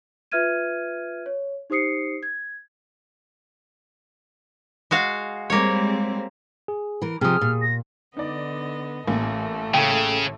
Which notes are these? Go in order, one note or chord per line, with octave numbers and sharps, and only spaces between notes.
F4 B4 E5 F6 G#6 D#7
C#5
D#4 G4 C5 D#6 C7 C#7
G#6
G#3 F#4 F5
G3 G#3 A#3 C4 C#5
G#4
E3 A#4
C3 F3 G#4 D#6 F6
A#2
A#6
D3 B3 D#4 D5 D#5
A1 A2 A3 A#3 G#5
C#3 A4 F5 G5